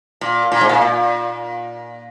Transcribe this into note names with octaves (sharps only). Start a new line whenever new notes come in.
A#2
A#2
G#2
A#2
A#2